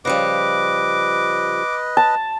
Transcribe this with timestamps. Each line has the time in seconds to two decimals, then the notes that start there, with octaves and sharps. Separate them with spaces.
0.05 C#3 F3 G3 B4 D#5 D6
1.97 A5